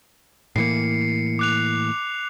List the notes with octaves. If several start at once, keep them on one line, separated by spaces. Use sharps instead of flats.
A2 E3 A#3 C7 C#7
D6 F#6 F7